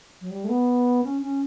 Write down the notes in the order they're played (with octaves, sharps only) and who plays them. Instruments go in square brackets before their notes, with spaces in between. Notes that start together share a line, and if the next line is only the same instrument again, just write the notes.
[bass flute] F#3
G3
A3
B3
C#4
C#4